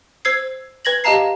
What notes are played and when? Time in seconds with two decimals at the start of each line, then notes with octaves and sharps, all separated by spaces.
0.25 C5 E6 G#6 C7
0.85 B4 G#6 A#6 F#7
1.04 G4 D#5 F5 A5 A#5 C7